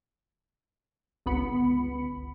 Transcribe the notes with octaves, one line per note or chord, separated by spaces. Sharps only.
G1 C#2 B3 B5 C#7